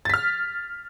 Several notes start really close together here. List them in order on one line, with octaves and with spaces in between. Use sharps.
A6 B6 F6